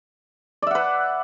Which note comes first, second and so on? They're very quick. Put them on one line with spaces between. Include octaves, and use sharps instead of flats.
D5 E5 F#5 B4